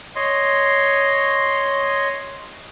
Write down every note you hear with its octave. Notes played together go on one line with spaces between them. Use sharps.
C#5 D#5 C6